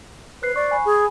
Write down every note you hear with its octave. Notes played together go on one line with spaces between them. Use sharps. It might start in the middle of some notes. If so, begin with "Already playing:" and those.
B4 C5 F#6 C7
D5 C#6
G#5 B5
G#4